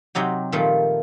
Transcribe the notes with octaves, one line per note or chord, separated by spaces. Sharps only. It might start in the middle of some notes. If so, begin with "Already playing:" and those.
C3 F#3 D#4 G4
A#2 D#3 F3 G3 A3 A#3